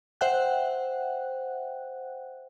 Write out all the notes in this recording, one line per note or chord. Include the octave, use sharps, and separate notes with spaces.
C5 E5 F#5 G5 F#6